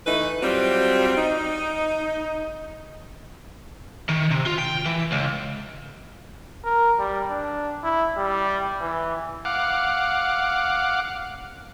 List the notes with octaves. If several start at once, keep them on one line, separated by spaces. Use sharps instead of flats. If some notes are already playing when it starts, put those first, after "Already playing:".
E3 A3 D#4 B4
F#3 G3 C4 F4
D#4
D#3
C3
F4
G5
E3
C#2
A#4
G3
D4
E4
G3
E3
F5 F#5 D6